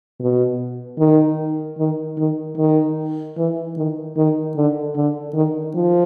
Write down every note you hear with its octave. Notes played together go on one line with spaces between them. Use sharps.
B2
D#3
D#3
D#3
D#3
E3
D#3
D#3
D3
D3
D#3
F3